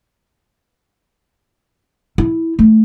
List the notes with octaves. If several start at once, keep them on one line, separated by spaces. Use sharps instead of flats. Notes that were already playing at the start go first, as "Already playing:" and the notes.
E4
A3